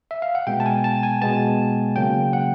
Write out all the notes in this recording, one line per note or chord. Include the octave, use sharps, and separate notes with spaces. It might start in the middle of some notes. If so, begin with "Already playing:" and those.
E5
F5
F#5
B2 G#3 B3 G5
A5
G#5
A5
G#5
B2 G#3 B3 A5
C#3 F#3 A#3 G5
F#5